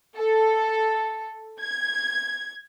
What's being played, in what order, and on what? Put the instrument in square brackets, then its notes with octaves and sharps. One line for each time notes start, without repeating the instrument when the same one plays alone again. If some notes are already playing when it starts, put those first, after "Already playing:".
[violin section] A4
G#6